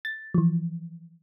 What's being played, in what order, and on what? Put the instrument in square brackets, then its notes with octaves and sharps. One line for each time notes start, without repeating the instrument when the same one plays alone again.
[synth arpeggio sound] A6
E3 F3